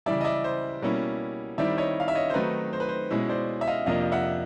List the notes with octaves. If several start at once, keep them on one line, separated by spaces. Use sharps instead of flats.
C#3 E3 G3 D5 E5
D#5
D5 E5
C5
B2 G3 A#3 C#4 E4
D#3 G3 C4 E4 D5 E5
C#5 D#5
F5
E5
C#5 D#5
C5
D#3 F#3 A3 C4 D#4 B4
C5
B4
C5
B2 G#3 C#4 E4
C5 D5
E5
D#5 F5
F2 C3 F3 A#3 D4 D#5 F5
E5 F#5